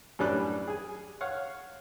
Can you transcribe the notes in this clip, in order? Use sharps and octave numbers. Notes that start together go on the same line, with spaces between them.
F#2 A2 G3 D4 B4 F#6
G#4 G#5
C#5 F5 F#5